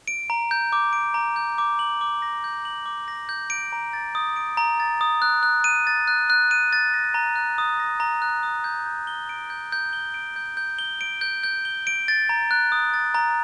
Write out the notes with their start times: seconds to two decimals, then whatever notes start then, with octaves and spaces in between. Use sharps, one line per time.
0.08 D7
0.30 A#5
0.51 G6
0.73 D6
0.93 D7
1.14 A#5
1.36 G6
1.58 D6
1.79 F#7
2.01 D6
2.22 A#6
2.44 G6
2.65 F#7
2.86 D6
3.08 A#6
3.29 G6
3.50 D7
3.73 A#5
3.93 A6
4.15 D#6
4.36 D7
4.57 A#5
4.80 A6
5.01 D#6
5.22 F#6
5.43 F#6
5.64 D#7
5.87 A6
6.07 F#6
6.30 F#6
6.51 D#7
6.73 A6
6.94 A#6
7.14 A#5
7.36 F#6
7.58 D#6
7.79 A#6
8.00 A#5
8.22 F#6
8.43 D#6
8.64 G6
8.86 G6
9.07 G7
9.29 D7
9.50 G6
9.72 G6
9.93 G7
10.14 D7
10.36 G6
10.57 G6
10.79 G7
11.01 D7
11.21 G6
11.44 G6
11.65 G7
11.87 D7
12.08 A6
12.29 A#5
12.51 F#6
12.72 D#6
12.94 A6
13.14 A#5